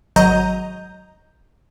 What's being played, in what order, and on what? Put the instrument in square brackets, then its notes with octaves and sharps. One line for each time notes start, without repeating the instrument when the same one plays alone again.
[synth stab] G#1 F#3 D#5 A#5 G6